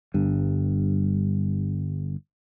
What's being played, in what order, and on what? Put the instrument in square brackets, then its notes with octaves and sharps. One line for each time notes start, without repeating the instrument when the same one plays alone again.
[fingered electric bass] G1 G2